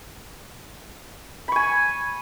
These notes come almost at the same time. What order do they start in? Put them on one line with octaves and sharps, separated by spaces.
B5 C#6 G#5